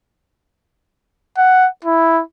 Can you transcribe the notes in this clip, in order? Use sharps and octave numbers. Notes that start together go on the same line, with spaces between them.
F#5
E4